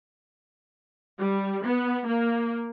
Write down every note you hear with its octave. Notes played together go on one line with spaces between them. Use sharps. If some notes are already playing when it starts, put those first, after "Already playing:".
G3
B3
A#3